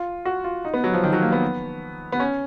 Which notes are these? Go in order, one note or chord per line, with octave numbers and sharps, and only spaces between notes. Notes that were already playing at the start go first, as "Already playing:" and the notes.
Already playing: F4
F#4
F4
D#4
B3
F#3
F3
D#3
F#3
A#3
B3
B3
C#4